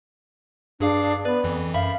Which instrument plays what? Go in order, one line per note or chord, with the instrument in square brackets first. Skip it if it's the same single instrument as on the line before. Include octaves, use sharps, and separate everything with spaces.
[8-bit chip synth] G2 G#4 F5 [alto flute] D4
[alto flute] B3 [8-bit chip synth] B4 D5
[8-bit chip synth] F2 E3
[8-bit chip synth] F#2 E5 B5 [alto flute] F5